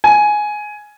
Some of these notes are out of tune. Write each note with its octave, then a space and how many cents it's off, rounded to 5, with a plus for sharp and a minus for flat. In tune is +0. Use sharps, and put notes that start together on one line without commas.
G#5 +10